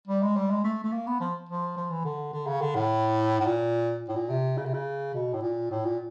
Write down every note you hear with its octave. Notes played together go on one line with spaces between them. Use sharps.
G3
G#3
G3
G#3
A3
A3
A#3
B3
F3
F3
F3
E3
D3
D3
C#3
D3
A2
A2
A#2
A2
A#2
C3
C#3
C3
C#3
B2
A2
A#2
A2
A#2